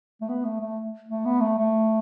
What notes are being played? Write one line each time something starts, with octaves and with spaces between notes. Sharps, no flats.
A3
B3
A3
A3
A3
B3
A3
A3